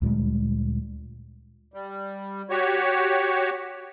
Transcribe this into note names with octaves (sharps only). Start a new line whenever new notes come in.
D2 A#2 G3 G#3
G3
F#4 G4 C#5